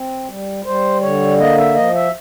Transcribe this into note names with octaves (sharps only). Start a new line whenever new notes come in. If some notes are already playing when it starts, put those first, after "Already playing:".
Already playing: C4
G3
G3 C5
D3 C#5
A#3 D#5
E5
F3 D#5
E5